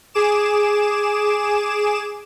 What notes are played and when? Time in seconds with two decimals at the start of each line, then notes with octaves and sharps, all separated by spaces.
0.14 G#4 D6 E7